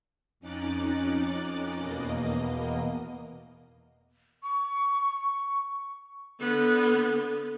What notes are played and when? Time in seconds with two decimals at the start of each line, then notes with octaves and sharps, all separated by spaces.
0.39 F2 C#4 D#4 D6 F#6 A6
1.76 E2 B2 A#3 D#5
4.42 C#6
6.40 D3 B3